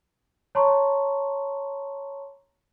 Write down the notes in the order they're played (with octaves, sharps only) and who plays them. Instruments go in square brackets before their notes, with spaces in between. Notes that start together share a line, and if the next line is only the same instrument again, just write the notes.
[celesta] C#5 A5 A#5 C6 C#6